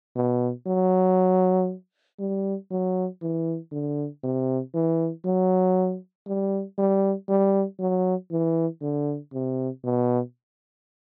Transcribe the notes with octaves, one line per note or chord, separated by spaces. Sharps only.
B2
F#3
G3
F#3
E3
D3
C3
E3
F#3
G3
G3
G3
F#3
E3
D3
C3
B2